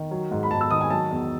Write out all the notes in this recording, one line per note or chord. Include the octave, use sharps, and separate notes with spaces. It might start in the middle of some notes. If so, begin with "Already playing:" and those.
Already playing: D#3
F#3
G#2
B5
G#2 A5
E6
D#3 D#6
G#5
F#3 A5
E2